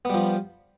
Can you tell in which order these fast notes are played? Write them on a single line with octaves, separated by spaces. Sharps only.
B3 G3 F3